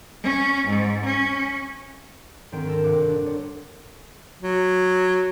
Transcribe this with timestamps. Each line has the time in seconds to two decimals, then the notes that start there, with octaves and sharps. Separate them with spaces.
0.23 C#4
0.68 G#2
1.05 C#4
2.52 D2 G#2 D#3 C4 G5 D7
2.67 C4 A4 A#4
2.84 D#1 G2 C3 F#5 D6
3.09 D4
3.25 C#5 D5
4.42 F#3